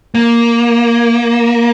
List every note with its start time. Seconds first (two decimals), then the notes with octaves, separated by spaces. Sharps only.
0.15 A#3